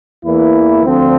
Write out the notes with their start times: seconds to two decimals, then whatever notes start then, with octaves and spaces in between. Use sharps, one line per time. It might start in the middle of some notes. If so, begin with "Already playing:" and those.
0.24 E2 E3 A#3 E4
0.83 D2 D3 F3 C4 F4